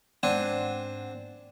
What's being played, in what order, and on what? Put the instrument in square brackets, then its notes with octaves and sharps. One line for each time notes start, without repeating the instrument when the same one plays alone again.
[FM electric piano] G#2 F#5 [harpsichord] C4 D4 G#5